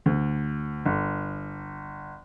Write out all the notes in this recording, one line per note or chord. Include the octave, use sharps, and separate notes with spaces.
D2
G1